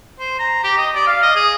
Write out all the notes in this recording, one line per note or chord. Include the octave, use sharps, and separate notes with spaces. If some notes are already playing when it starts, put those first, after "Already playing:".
C5
A#5
G4
D#5
D5
F5
D#5
G#4